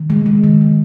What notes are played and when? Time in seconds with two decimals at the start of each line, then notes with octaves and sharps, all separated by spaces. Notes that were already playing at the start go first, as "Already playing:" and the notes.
Already playing: D#3
0.10 G#3
0.26 G#3
0.44 D#3
0.61 D#3